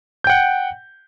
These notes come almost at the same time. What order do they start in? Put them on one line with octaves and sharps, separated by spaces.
G6 G5 F#5